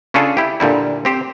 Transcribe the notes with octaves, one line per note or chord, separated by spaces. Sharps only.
C#3 C#4 D4 F4 G#4 A4
E4 G4
A#2 D3 G3 E4
C4 G4 C5